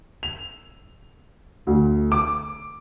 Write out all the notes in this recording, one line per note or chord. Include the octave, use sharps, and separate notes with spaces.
F7
D2
D6